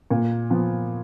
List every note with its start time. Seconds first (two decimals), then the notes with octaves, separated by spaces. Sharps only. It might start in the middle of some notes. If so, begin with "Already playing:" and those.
0.11 A#2
0.50 F3 B3